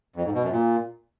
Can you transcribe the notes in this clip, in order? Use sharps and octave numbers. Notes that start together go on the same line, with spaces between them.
F2
G#2
B2
F#2
A#2